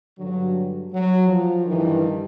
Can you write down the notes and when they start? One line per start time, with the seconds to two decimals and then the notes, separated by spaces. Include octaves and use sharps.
0.18 G2 D3 F#3
0.92 F#3
1.29 F3
1.65 G2 D#3 E3